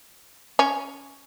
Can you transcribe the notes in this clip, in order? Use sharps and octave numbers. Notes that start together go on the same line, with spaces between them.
C#4